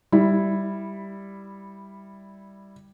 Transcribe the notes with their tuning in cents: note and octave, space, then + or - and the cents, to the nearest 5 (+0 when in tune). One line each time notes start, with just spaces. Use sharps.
G3 +0 E4 +0